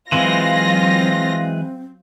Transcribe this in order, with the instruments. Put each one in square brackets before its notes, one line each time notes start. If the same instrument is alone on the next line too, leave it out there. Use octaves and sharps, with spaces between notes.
[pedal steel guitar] E3 G#3 [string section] F#3 F4 A#6 [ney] C4